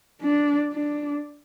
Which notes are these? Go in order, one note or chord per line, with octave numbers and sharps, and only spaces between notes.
D4
D4